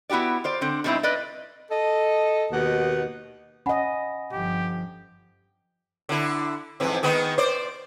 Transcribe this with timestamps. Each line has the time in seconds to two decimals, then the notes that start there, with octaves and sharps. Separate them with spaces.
0.10 B3 E4 F#4 G4 D5
0.44 F4 C5 D5
0.61 D3 C4
0.84 B2 F#3 G3 C4 D#4 E4
1.03 B4 D5 D#5
1.71 A4 D#5
2.52 D#2 B2 D#4 F#5
3.66 C#4 D#5 F#5 G#5 B5
4.33 G1 F3 G4
6.09 D3 E4
6.80 F2 G#2 E3
7.03 D#3 G#3 B3
7.38 C5 D5